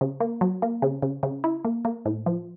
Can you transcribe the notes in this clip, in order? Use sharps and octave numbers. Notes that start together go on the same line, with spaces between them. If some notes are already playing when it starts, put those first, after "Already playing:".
C#3
A#3
F#3
A#3
C#3
C#3
C#3
E4
A#3
A#3
A2
F3